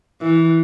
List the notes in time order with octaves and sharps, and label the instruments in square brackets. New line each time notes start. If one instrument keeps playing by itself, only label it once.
[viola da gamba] E3